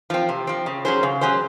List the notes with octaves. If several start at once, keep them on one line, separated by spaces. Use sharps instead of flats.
F3 C4
C3
F3 C4
C#3
F#3 C#4 G#4 C5
C#3
F#3 C#4 G#4 C5